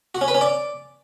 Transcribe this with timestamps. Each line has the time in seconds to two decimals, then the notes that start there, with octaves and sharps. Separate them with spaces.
0.15 F#4
0.21 C#4
0.28 B4
0.34 C#4
0.41 D5